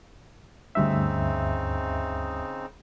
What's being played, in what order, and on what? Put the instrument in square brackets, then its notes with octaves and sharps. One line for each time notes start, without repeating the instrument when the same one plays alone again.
[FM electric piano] D2 G2 E5 [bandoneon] C#3 C4 D#4